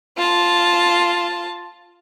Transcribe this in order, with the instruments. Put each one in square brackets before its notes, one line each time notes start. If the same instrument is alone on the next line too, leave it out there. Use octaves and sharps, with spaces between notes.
[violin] F4 A5